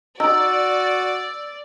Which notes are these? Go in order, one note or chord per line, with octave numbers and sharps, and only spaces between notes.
D#4 F#4 D5 E6